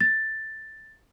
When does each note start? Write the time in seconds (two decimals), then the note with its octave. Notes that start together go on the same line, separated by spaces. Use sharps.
0.01 A6